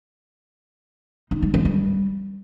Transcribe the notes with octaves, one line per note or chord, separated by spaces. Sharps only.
D#4
G3
F3
G3